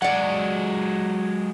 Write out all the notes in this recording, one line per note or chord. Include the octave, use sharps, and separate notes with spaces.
F#3 G#3 D5 F#5